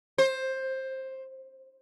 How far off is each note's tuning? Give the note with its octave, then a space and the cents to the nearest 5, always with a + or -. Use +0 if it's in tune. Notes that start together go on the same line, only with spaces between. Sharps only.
C5 +15